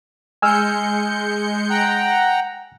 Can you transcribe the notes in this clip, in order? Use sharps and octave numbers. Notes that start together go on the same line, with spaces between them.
G#3 G#5 E6 F6 G6 C#7
F#5 G5 A#5